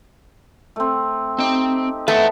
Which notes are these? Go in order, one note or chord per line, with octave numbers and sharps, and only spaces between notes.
A3 C4
C4 D#4 G4 G5
A3 B4 E5 F#5